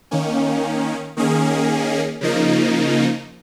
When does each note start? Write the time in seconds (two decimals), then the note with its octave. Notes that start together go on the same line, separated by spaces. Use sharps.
0.11 D#3 A#3 C#4
1.17 D#3 A#3 C#4 G#4
2.21 C#3 F3 A#3 D#4